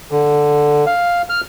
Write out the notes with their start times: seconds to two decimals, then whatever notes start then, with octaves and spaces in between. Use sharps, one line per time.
0.11 D3
0.86 F5
1.29 F6